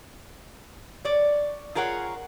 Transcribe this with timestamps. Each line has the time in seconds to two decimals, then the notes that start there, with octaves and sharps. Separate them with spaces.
1.05 C#5 D5
1.75 F4 G#4 A#4 C#5 F#5